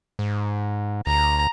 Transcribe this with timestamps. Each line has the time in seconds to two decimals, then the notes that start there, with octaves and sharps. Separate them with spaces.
0.19 G#2
1.07 D2 A#5